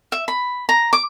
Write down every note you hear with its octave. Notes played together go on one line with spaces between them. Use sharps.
E5
B5
A#5
D6